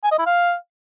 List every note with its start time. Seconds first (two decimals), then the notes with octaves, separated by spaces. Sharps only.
0.04 G#5
0.11 D#5
0.19 E4
0.26 F5